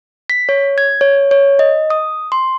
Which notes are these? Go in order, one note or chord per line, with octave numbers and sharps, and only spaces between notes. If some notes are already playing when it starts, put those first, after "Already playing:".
B6
C#5
G#6
C#5
C#5
D#5
D#6
C6